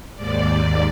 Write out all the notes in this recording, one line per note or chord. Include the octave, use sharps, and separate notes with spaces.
D#2 G#2 D5